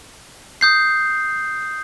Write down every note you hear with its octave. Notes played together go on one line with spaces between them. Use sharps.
D#6 G6 C7